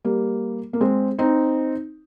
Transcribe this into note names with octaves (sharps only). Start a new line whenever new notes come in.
G3 A#3
A#3
G#3 C4
C4 D#4